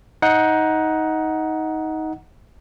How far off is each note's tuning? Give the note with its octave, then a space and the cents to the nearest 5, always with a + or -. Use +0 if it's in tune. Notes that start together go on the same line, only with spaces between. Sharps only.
D#4 +15 F#5 +0